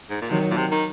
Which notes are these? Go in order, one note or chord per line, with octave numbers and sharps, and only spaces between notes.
G#2
A#2
C3 D#3 F#3
A#2
C3
D#3